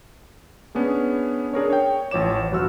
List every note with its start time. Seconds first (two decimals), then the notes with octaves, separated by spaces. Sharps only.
0.75 B3 C#4 D4 G#4
1.54 D4 G#4 A#4 C#5
1.70 C#5 G5
2.11 A1 F3 C#5 D6 E7
2.52 G1 F#4 E6 F6